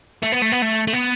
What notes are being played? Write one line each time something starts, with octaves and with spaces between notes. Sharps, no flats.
A3
B3
A3
B3
A3
A3
B3